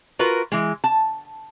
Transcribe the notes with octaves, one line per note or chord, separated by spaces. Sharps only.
F4 F#4 A#4 B4
E3 G#3
A5